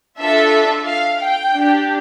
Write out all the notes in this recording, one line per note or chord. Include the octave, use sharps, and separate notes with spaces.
D4 F4 A4 E5
F5
G5
D4 G4